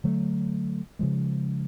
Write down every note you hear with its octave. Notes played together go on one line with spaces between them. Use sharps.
D3 F#3 A3
C#3 F3 G#3